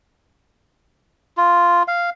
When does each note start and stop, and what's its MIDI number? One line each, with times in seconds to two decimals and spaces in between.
1.37 1.83 65
1.88 2.10 77